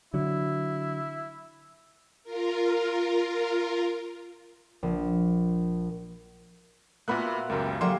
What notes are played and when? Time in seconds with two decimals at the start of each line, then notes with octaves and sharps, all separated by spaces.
0.14 D3 F#3 E4
2.23 F4 A#4
4.83 A#1
7.08 A#2 A#3 B3 F4 F#4 E5 B5 F#6
7.50 C#2 F#2 A#3 G4 A#4
7.66 G#5
7.81 D3 F#3 A#3 G4 E5 C6